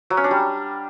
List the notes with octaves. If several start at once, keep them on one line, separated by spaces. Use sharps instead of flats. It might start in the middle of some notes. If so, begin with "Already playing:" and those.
F#3
C#4
D4
G3